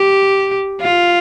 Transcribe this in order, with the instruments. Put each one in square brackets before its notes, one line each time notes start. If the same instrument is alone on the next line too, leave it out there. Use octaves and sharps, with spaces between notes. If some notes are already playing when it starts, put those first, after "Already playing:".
Already playing: [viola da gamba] G4
F4